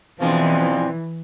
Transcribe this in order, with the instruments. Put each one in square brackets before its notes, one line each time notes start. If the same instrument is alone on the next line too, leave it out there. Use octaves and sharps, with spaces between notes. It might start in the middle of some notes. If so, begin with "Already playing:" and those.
[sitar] G#2 G#3 D4 [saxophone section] B2 F3 [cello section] E3 [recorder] C4